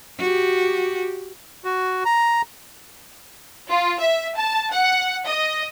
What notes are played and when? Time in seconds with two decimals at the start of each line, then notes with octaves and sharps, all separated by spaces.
0.19 F#4 G4
1.65 F#4
2.05 A#5
3.69 F4
4.01 E5
4.38 A5
4.73 F#5
5.27 D#5